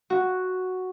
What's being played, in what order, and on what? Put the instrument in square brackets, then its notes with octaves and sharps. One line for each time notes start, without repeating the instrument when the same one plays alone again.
[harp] F#4